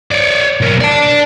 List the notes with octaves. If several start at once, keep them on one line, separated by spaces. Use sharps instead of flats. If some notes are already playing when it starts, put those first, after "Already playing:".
C#5 D5
B1 A#4
D5 A5